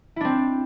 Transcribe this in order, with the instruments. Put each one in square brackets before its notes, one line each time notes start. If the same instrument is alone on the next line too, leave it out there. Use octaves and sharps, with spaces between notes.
[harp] E4
D4
C4